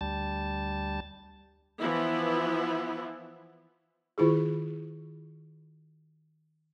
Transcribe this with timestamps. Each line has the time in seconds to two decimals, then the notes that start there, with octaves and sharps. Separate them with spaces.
0.01 D2 G3 A5
1.80 E3 F3 B3 E4
4.18 D#3 E4 F4 G#4